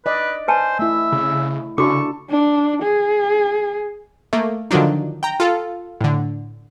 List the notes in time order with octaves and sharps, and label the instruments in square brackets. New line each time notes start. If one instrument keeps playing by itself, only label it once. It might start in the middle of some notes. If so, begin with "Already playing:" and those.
[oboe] B4 [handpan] D5 D#5
[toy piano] B4 G#5 A5 [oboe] C5
[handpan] A3 E4 [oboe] E5
[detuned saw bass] C#3
[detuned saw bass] C#3 [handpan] D4 A4 [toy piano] F#4 D6 [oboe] C#6
[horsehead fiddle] D4
G#4
[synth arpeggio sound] A3 A#3
D3 D#3 F3 F#3 D4 D#4
G5 A#5
F4 A4
A2 D3